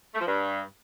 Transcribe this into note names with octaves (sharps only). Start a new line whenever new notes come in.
A3
F3
G2